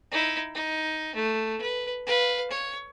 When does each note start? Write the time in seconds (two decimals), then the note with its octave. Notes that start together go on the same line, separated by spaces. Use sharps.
0.11 D#4 E4
0.55 D#4
1.15 A3
1.61 B4
2.06 B4 F5
2.51 C#5